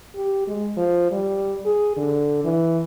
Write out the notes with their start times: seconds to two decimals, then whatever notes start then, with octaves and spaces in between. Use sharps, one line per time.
0.15 G4
0.47 G#3
0.77 F3
1.11 G3
1.66 G#4
1.97 D3
2.44 E3